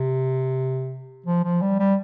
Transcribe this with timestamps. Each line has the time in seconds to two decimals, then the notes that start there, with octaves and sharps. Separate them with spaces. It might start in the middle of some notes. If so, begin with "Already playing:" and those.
Already playing: C3
1.26 F3
1.43 F3
1.61 G3
1.79 G3